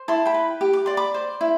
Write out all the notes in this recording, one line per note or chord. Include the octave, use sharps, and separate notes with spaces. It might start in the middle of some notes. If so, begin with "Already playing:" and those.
Already playing: C5
E4 A5 C6
G5 B5
B4
G4
D6
D5 C6
B5 D6
C5
E4